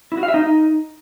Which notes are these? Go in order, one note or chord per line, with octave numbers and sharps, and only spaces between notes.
E4
F#4
F5
E5
D#4